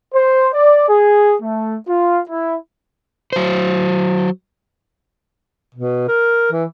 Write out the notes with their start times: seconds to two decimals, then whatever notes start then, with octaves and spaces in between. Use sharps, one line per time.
0.13 C5
0.53 D5
0.88 G#4
1.40 A3
1.87 F4
2.29 E4
3.33 F#3 C5
5.75 B2
6.08 A#4
6.52 E3